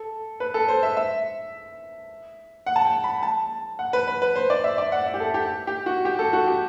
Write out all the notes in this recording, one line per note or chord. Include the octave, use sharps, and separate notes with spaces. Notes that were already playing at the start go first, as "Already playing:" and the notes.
Already playing: A4
B4
A4
C5
E5
E5
F#5
A5
G5
B5
A5
F#5
B4
B4
B4
C5
D5
E5
D5
F#5
E5
G4
A4
G4
G4
F#4
G4
A4
F#4
G4